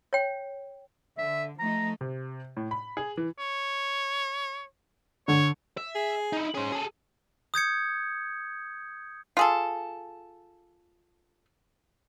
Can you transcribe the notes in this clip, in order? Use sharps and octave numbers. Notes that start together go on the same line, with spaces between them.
C#5 G5
D3 E5
F3 A3 D#4 A#5
C3
A2
B5
G#4
E3
C#5
D3 C#5
E5
G#4
D#4 E4
C#4 G#4 C5
G#4 A4
D#6 G6 G#6 C#7
F4 G#4 A4